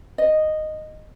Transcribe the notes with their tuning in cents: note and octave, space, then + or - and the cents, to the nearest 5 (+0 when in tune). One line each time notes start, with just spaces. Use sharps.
D#5 -10